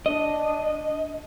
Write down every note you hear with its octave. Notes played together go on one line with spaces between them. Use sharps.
D4 D#5